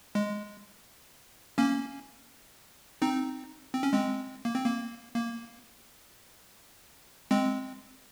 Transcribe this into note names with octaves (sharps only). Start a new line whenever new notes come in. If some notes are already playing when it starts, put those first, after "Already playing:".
G#3
A#3 C#4
C4 D#4
C4
C#4
G#3 C4
A#3
C4
A#3
A#3
G#3 C4